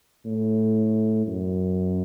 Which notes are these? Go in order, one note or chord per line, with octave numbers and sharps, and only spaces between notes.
A2
F#2